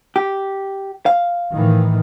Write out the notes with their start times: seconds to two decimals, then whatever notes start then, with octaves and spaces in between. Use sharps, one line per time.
0.16 G4
1.06 F5
1.53 A2 D#3 E3